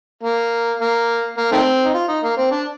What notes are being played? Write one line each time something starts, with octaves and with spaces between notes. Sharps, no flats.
A#3
A#3
A#3
D#3 A3 C4
D#4
F4
D#4
A#3
C4
D4